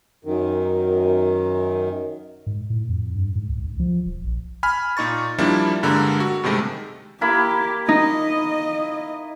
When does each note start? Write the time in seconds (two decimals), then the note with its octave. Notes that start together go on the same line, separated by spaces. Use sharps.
0.25 F#2 D#3
2.47 G#2
2.70 A2
2.89 F2
3.15 G2
3.36 G#2
3.49 C#2
3.67 C#2
3.80 F3
4.06 D#1
4.24 A#1
4.63 G#5 B5 F6
4.97 A#2 D#4 C#6 A6
5.38 F3 G3 A#3 D4 E4
5.83 G2 D3 G3 G#3 A#3 A#5
6.20 F#4
6.43 G2 C3 D#3 G#3 A3
7.21 A#3 E4 G4 B5
7.89 D#4 D#5